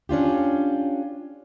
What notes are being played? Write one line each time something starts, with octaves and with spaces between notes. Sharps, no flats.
C#4 D4 F4 G4